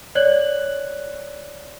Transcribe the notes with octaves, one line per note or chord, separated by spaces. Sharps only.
C#5 D5 F#6 G#6 F#7